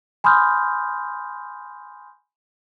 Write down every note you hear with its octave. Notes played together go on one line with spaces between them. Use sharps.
G#5 B5 C6 D#6 F6 G6